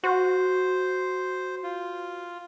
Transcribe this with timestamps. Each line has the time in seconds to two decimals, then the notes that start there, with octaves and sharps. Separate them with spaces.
0.04 F#4 C5
1.63 F4